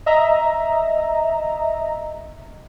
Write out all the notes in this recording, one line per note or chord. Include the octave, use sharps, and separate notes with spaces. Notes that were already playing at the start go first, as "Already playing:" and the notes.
D#5 E5 A#5